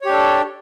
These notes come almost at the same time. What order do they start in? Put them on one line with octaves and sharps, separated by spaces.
C#5 G4 D4 A4